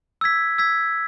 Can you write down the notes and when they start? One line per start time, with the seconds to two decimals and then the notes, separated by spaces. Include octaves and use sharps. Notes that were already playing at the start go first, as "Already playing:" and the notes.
0.21 E6 G#6 B6
0.58 E6 G#6 B6